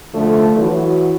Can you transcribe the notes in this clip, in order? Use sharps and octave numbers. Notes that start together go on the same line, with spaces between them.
D3 F3 A3
E3 F#3 F#4